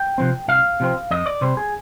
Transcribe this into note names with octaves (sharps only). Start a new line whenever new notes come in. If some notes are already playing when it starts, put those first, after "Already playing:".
Already playing: G5
C3 F3 C4
C2 F5
C3 F3 C4
F2 D#5
D5
C3 G3 C5
G#4